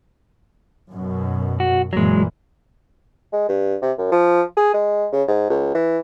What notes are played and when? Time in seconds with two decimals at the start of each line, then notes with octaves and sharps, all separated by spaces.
0.92 F#2 B2
1.60 F#4
1.93 F#1 A#2 E3 F#3 G#3
3.33 G#3
3.49 G2
3.82 C3
3.98 F#2
4.12 F3
4.57 G#4
4.74 G#3
5.13 C#3
5.28 G#2
5.50 C#2
5.75 E3